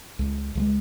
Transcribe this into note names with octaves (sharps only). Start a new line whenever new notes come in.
C#2
C#2 F3 G#3